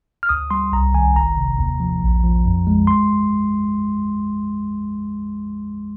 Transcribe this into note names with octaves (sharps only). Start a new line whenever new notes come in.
F6
D2 D#6
G3 C6
C2 A#5
D#3 G#5
G1 A#5
C3
D#2
F3
A#1
F3
F2
G#3
C6